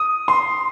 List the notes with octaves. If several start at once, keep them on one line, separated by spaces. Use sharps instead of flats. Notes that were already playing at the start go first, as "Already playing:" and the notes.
Already playing: D#6
C6